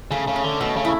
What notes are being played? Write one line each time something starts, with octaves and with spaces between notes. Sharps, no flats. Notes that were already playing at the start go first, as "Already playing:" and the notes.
C#3 A3
C#3
C#4
D3
B2 A3
C#3
E4